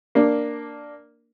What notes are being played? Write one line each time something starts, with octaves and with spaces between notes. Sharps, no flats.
A#3 D4